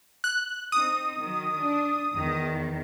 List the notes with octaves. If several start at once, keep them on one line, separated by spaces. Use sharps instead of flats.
F#6
C4 D#4 D#6
D#3 F#3
D4
E2 D#3